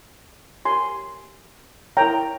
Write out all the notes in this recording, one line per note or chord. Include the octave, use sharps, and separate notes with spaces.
G4 A#4 C#5 G#5 C6
E4 A#4 C#5 G5 A#5